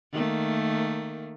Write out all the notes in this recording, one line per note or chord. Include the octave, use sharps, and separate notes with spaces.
D#3 A3 A#3